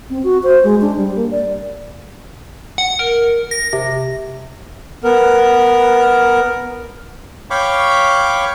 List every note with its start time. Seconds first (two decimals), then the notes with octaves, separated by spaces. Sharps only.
0.10 C4
0.24 F#4
0.43 C5
0.64 G#3
0.81 D4
0.97 G3
1.16 A#3
1.31 D5
2.78 F#5
2.99 A#4
3.51 A#6
3.73 C3
5.04 B3 A#4
7.50 C#5 F5 G5 B5 C#6 D6